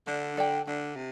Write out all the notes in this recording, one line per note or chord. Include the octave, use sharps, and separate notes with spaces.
D3 D4
A4 D5 G5
D3 D4
C3